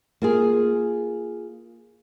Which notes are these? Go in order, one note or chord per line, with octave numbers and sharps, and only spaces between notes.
A#3 F4 G#4